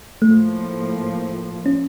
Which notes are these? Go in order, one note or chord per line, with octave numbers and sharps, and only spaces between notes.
A2 F3 A3 A#3
C#4